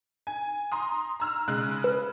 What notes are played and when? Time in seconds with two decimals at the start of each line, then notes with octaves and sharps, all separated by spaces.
0.27 G#5
0.72 A#5 C6 D#6
1.20 A#5 E6 F6
1.48 C#3 G#3 F#6
1.84 B4